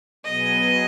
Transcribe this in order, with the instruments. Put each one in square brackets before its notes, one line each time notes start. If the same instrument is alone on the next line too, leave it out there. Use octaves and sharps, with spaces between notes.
[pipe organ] B2 F#3 B3 G#4 [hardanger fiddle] D#5